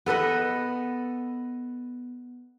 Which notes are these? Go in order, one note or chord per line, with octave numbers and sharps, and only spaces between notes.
B3 A4 B4 D#5